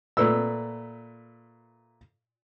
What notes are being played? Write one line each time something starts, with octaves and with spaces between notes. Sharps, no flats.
A#2 A3 B4 E6